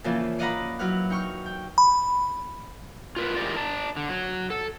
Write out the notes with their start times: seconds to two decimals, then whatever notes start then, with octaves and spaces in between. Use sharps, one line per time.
0.04 A#2 C#3 E3 F3 E4 F4
0.39 D5 D#5 F5 F#5 A#5 B5
0.79 F#3 E4 B4 F#5 F6 F#6
1.10 D#4 G5 C#6 F6
1.46 G5
1.78 B5
3.16 F4 A#4 B4
3.36 E3 G#3 A3 G4 A#4 D5
3.56 D5 A5 A#5
3.97 D3
4.09 F#3
4.50 A4